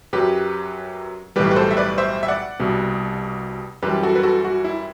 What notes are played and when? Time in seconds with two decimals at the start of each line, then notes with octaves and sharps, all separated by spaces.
0.13 F#2 F#3 G4 B4
1.36 B1 A2 E3 G3 G4 B4
1.51 B4
1.56 A4 C5
1.71 E5
1.77 B4 D5
1.98 C5 E5
2.23 E5
2.28 D5 F#5
2.59 C2 B2 G3
3.83 F#2 E3 G3 G4 B4
4.03 F#4 A4
4.15 B4
4.23 F#4 A4
4.45 F#4
4.64 E4